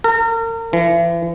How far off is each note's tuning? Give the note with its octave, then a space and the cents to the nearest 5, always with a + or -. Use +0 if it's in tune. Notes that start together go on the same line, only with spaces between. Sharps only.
A#4 -35
E3 +40